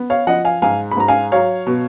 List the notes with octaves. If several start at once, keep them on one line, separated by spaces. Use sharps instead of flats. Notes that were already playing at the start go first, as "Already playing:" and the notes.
Already playing: B3
C#5 F5
F3 D#5 F#5
F5 G#5
G#2 F5 G#5
B5
G#2 A#5
F5 G#5
F#3 C#5 F5
B2